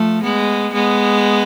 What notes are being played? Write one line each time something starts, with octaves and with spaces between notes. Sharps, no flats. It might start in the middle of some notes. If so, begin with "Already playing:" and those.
Already playing: F3 A3
G#3 B3
G#3 B3